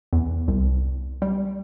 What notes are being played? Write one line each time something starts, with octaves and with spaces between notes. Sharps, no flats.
E2
C2
G3